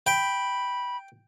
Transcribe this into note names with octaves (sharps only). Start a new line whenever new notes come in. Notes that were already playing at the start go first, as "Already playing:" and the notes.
G5 B5